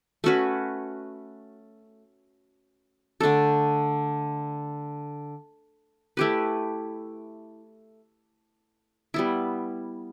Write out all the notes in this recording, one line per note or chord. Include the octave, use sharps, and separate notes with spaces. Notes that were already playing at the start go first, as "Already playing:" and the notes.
A3 C#4 F#4 B4
D3 A3 D4 A4
A3 E4 G4 B4
G3 B3 E4